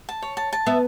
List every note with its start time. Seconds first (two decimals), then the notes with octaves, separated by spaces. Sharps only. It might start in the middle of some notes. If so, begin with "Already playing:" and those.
0.09 A5
0.22 C#5
0.37 A5
0.53 A5
0.66 B3 E5